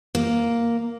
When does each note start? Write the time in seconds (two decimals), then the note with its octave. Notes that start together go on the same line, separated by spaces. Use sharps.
0.15 A#3